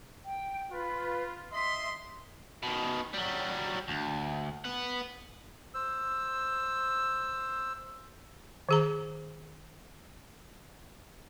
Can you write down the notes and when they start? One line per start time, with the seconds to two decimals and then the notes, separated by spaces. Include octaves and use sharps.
0.24 G5
0.71 F4 B4
1.52 D#5 E5 C6
2.63 B2 D#3
3.14 F#3 G3
3.88 D2
4.64 B3 F#5
5.74 C5 E6
8.69 D#3 G#4 A#5